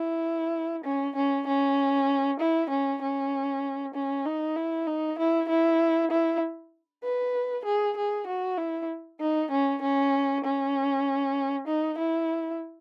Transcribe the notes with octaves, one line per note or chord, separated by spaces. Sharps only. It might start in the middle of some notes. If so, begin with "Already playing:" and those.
Already playing: E4
C#4
C#4
C#4
E4
C#4
C#4
C#4
D#4
E4
D#4
E4
E4
E4
B4
G#4
G#4
F#4
E4
D#4
C#4
C#4
C#4
D#4
E4